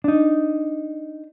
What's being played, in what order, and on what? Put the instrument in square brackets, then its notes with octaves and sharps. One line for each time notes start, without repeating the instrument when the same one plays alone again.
[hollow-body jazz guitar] D4 D#4